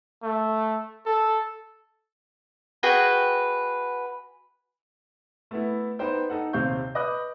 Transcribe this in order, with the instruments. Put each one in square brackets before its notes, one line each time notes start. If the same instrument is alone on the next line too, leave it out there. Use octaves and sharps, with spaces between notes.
[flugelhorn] A3
A4
[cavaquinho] F#4 G#4 B4 G5
[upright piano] A3 B3 E4
B3 D#4 B4 C5 G5
D#4 A4 F#5
D#2 C3 C4 F5 C#6 G6
B4 D#5 D6 D#6 F#6